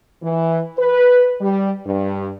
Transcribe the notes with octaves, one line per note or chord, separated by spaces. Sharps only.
E3
B4
G3
G2